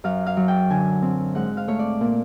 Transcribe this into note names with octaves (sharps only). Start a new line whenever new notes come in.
F#2 F5
F5
F#3
G5
D3 G#5
C4
G#2 F#5
F5
A3 C#5
D5
A#2